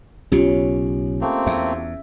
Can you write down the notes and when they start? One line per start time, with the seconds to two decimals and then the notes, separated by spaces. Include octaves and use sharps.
0.32 B1 C#3 C#4 F4 G4
1.21 A3 A#3 C4
1.47 E2 E5